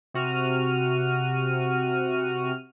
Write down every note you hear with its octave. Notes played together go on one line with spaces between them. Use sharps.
C3 F#4 F6 D#7